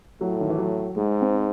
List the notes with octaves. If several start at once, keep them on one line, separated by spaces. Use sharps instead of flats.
A2 F#3
D#3
E3
F#3
G#2 G#3
C4